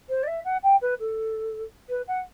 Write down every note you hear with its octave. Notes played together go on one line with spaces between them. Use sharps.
C5
D5
E5
F#5
G5
B4
A4
B4
F#5